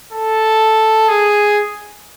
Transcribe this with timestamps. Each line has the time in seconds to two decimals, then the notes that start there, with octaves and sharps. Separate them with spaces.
0.13 A4
1.09 G#4